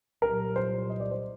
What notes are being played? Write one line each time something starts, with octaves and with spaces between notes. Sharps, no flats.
C2 A#2 F#3 A#4
C5
D#5
D5
C5